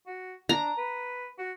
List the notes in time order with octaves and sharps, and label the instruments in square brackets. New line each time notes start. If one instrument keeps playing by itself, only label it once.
[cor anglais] F#4
[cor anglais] D4 [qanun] A#5
[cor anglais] B4
F#4